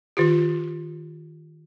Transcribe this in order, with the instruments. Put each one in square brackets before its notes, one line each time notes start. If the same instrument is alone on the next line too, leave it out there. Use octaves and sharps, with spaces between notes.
[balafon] D#3 F4 G4